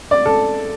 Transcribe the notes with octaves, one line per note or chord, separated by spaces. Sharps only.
D5
A4